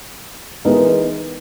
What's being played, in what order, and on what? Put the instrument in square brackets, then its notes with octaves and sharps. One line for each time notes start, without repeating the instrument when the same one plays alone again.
[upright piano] E3 G#3 B3 D#4 A#4